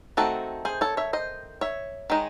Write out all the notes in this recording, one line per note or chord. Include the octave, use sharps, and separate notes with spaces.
D#3 A3 C4 F#4 A4
G#4 C5
A4 C#5
C#5 E5
C5 D#5
C#5 E5
D#3 G#3 D#4